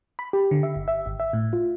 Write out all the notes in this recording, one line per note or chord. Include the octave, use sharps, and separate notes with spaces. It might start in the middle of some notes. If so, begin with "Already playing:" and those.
B5
G4
D3
E5
G1
E5
G#1
E5
A2
F4